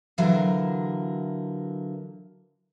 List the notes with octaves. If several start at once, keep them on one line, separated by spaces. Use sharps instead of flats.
D3 E3 F#3 F4 A#4